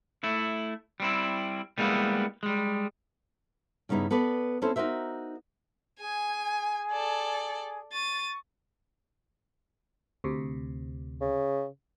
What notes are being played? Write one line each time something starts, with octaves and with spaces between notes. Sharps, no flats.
A3 E4
G3 C4 E4
G3 G#3 A#3 B3 E4
G3 G#3
G2 C#3 B3 D#4 E4
B3 A4 B4 D5
C4 C#4 E4 A4 C5
D#4 F#4 A#4 C5 E5
G#4 G#5
A4 D5
C#6 A6 D#7
D2 C3
C#3